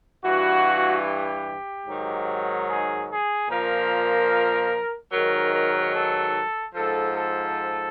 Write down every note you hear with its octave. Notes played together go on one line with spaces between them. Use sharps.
G2 E3 F#4
G4
G#2 D#3 F#3
G#4
G#4
A#2 F3 A#4
G#2 D#3 F#3 A#4
A#4
A4
G#2 F3 A4
A4